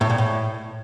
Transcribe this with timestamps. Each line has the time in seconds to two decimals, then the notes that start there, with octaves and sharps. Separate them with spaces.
0.01 A2
0.10 A#2
0.18 A2